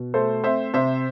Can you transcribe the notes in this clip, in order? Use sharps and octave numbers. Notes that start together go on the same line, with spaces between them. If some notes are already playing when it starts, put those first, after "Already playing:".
Already playing: B2
A3 A4 C5
C4 C5 E5
C3 C5 E5